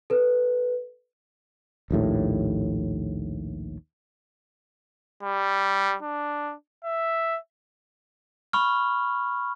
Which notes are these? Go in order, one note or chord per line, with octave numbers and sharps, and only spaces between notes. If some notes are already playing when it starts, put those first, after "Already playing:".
A4 B4
A#1 D#2 A2
G3
D4
E5
B5 C#6 F6